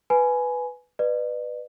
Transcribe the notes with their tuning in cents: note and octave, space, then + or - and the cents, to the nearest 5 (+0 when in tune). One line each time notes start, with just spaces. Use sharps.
B4 +0 G#5 +15 B5 +0
B4 +0 D5 +45